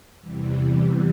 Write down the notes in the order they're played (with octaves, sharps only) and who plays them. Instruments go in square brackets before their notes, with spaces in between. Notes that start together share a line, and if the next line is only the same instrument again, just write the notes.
[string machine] E2 C3 E3 G3